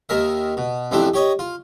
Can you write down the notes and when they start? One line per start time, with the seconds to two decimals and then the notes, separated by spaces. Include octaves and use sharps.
0.09 D#2 D#3 A#4 E5
0.57 B2
0.91 A1 F2 E3 C4 D4 G4
1.14 G4 C#5 D#5
1.39 F4